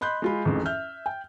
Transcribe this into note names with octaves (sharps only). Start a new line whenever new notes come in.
D#5 B5 C6 F#6 G6
G#3 F4 B5
A1 F2 G#2
E5 F6 G6
G5